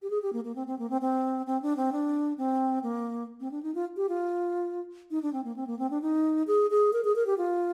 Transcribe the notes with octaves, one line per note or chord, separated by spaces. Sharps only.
G4
G#4
G4
A#3
A#3
C4
C4
A#3
C4
C4
C4
D4
C4
D4
C4
A#3
C4
D4
D#4
F4
G4
F4
D#4
D4
C4
A#3
C4
A#3
C4
D4
D#4
G#4
G#4
A#4
G#4
A#4
G4
F4